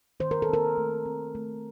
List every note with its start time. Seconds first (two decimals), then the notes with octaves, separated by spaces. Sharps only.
0.20 D#3 C5
0.31 A#4
0.42 A4
0.49 C4 A#4
0.78 A3
1.06 C4
1.35 A3